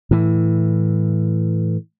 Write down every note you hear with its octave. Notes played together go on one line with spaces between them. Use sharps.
A2 E3